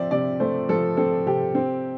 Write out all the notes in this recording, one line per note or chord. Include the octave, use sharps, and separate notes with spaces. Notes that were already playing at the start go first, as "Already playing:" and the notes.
Already playing: F3 C4 D5 E5
C3 D5
A3 C5
F3 A4
C4 A4
C3 G4
C4